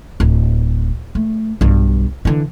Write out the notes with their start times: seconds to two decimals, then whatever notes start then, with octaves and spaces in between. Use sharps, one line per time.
0.20 D1
1.15 A3
1.61 B1 G2
2.25 D3 E3